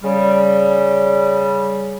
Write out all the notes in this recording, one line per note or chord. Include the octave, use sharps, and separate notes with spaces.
C#3 G3